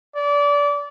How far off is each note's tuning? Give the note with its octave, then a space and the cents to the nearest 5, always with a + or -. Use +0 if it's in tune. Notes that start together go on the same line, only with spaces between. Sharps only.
D5 -25